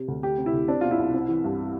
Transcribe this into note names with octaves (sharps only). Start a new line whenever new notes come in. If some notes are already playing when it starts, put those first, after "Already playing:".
Already playing: C3
D2
A3 G4
C3
E4
D2
C4 D4
B2 F4
E4
C2
C4
E3
G2